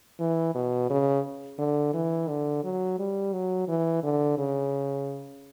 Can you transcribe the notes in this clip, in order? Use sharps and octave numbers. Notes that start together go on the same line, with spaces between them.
E3
B2
C#3
D3
E3
D3
F#3
G3
F#3
E3
D3
C#3